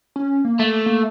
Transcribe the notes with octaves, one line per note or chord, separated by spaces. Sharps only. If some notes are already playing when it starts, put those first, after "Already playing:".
C#4
A#3
A3
A#3